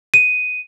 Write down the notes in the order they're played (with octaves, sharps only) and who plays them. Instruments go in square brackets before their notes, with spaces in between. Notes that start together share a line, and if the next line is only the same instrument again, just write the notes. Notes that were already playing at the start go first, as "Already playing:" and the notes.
[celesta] D#7